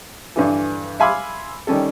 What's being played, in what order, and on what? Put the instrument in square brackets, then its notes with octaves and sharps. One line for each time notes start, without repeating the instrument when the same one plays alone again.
[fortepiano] G2 D3 E3
E5 F5 G#5 B5 C6 D6
D#3 G3 C#4 A4